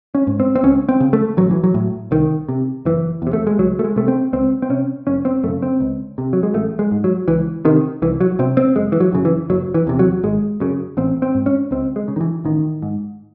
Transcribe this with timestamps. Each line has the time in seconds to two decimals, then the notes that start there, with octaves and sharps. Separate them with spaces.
0.15 C#4
0.27 G#2
0.40 C4
0.55 C4
0.63 C#2 C#4
0.89 C4
1.00 C#3
1.13 A3
1.37 A1 F#3
1.51 E3
1.64 F#3
1.74 A2
2.11 C2 D#3
2.49 C3
2.85 F#1 E3
3.22 E2 C3
3.33 A3
3.47 G#3
3.59 C#2 F#3
3.79 A3
3.84 G#3
3.96 C3 A3
4.08 C4
4.33 C#2 C4
4.62 C4
4.70 C3 C#4
5.07 F#1 C#4
5.25 C4
5.43 F#2 A3
5.48 C#3
5.62 C4
5.80 C#2
6.18 C3
6.33 F#3
6.43 G#3
6.54 A1 A3
6.79 G#3
6.91 G#2
7.04 F#3
7.28 C#2 E3
7.65 C3 D#3
8.02 C2 E3
8.21 F#3
8.39 C3 C4
8.57 C4
8.76 F#1 G#3
8.92 E3
9.00 F#3
9.13 F#2 C#3
9.25 E3
9.50 F#1 F#3
9.74 E3
9.87 E2 C3
9.99 F#3
10.23 G#1 G#3
10.60 F#2 C#3
10.97 A1 C4
11.22 C4
11.35 G#2
11.46 C#4
11.71 C#2 C4
11.96 G#3
12.08 C#3
12.16 D#3
12.21 E3
12.45 A1 D#3
12.83 G#2